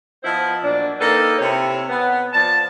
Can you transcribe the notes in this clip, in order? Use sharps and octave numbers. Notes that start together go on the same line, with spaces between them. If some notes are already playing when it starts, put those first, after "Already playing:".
F3 B3 E4 C5 D#5
A#2 F#3 D4
A#3 D#4 A4 B4 G5
C3 E4 C#5
B3
F3 D5 A5